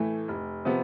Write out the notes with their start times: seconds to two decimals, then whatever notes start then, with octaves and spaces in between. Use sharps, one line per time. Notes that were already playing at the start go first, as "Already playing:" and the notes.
Already playing: A2 E3 A3
0.28 F1
0.65 C3 F3 B3